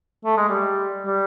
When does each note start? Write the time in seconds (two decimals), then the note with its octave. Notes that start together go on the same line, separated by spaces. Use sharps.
0.25 A3
0.37 G#3
0.49 G3
1.06 G3